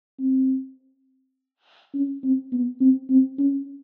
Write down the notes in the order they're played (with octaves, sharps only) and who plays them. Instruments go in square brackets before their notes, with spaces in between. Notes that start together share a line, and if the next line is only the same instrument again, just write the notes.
[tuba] C4
C#4
C4
B3
C4
C4
C#4